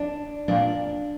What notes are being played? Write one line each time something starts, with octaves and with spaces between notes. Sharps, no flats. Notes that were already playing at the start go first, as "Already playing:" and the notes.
Already playing: D4
A#2 D4